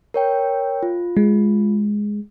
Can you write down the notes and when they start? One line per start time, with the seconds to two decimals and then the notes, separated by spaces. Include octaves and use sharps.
0.14 A#4 C#5 G5
0.83 F4
1.17 G#3